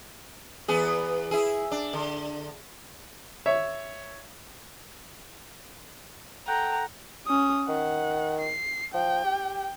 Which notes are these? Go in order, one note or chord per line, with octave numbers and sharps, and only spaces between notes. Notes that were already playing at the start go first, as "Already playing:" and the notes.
E2 B3 G#4
E4 G#4
D4
D3
C#5 E5
A4 F#5 G5 A#5
C#4 D#6
D#3 F#5
C7
F3 G5
G4